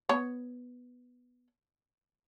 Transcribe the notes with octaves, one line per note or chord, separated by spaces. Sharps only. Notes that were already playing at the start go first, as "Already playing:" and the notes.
B3 C#5